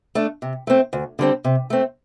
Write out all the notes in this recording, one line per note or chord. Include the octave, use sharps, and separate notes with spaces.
A3 D4
C3
A3 C4
D2
D3 G3 C4
C3
A3 C4